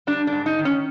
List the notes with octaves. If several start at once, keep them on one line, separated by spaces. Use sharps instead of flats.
G3 D4
D4
G#2
D#4
D#3
C#4